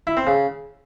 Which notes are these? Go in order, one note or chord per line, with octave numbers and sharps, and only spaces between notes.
E4
C4
C#3